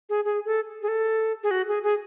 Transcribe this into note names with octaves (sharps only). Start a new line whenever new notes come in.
G#4
G#4
A4
G#4
A4
G#4
F#4
G#4
G#4